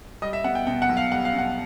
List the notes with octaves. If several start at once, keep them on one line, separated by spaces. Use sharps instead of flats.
G3 D#5
E5
B3 F#5
G5
B2 G5
F#5
B1
F5
G3 F#5
F5
B2 F#5